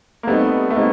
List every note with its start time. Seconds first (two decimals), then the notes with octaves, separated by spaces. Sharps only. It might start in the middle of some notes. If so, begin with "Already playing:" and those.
0.23 A#3
0.27 G3 A3 B3 C4 D#4
0.70 A3
0.76 G3 G#3 A#3 C4 D#4